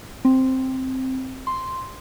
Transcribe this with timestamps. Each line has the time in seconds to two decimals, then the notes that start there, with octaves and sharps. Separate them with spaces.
0.25 C4
1.47 C6